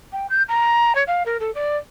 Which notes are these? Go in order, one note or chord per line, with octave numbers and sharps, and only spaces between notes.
G5
G6
A#5
C#5
F5
A#4
A4
D5